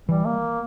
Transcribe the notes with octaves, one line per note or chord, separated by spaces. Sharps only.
E3 G3
A#3